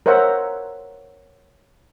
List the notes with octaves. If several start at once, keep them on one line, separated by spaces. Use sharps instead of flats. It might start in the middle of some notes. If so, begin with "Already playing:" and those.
A#4 C5 C#5 E5 F#5 A#5